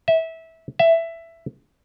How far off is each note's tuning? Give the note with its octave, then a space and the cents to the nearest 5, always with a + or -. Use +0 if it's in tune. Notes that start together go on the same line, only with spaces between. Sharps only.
E5 -20
E5 +10